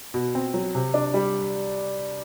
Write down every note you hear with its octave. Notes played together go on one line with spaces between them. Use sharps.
B2
C4
F#3
C3
D4
G3